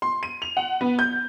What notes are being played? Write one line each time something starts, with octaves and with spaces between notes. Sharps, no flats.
C6
D#7
F7
F#5
B3
G6